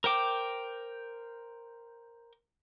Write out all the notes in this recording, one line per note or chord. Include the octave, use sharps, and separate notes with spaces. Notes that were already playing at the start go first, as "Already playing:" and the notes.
A#4 C5 G5 D6